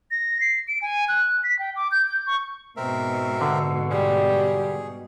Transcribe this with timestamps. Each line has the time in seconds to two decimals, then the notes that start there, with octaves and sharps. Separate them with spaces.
0.11 A#6
0.41 C7
0.68 D7
0.82 G#5
1.09 F#6
1.44 B6
1.59 G5
1.76 D6
1.92 G6
2.07 G6
2.27 C#6
2.77 G#2 B2 C4 A#4 E5
3.41 D3
3.90 G3 G#4